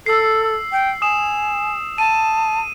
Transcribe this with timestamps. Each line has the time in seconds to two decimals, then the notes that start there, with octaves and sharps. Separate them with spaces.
0.06 A4 E6 C7
0.72 G5
1.02 G#5 D#6 E7
1.98 A5 D#7